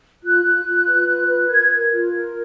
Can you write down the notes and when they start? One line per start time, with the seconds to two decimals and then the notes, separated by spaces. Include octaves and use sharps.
0.23 F4 F#6
0.44 F4
0.66 F4
0.87 B4
1.07 F4
1.28 B4
1.49 A#4 G#6
1.71 A#4
1.92 F4
2.12 A#4